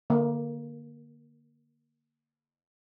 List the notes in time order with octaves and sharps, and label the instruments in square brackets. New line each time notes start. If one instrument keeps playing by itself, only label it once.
[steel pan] D3 A#3